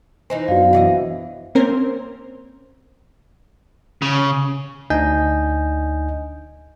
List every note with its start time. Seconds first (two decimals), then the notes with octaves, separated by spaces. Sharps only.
0.30 E3 D#4 C5 G#5
0.48 F#2 B3 D4 F#4 D5 F5
0.73 E3 D5 D#5 F#5
1.55 A#3 C4 C#4 A#4 C5
4.02 C#3
4.90 D2 D4 D#4 D#5 G#5 G6